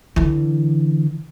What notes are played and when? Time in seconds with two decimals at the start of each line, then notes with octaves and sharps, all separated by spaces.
0.16 D3 E3